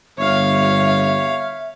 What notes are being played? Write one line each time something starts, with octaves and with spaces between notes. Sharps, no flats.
G1 C#5 E5 F5